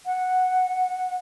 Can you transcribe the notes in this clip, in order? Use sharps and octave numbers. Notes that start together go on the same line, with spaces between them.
F#5